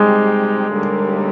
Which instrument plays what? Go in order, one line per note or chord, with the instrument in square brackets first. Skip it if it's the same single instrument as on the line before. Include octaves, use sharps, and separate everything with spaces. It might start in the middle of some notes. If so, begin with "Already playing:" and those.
Already playing: [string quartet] G3 C4 D#4 G4 [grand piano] G#3
[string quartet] D#2 D3 G3 A#3